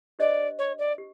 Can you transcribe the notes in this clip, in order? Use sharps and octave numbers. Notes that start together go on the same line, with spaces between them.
D4 G4 C5 D5 D#5
C#5
D5
G4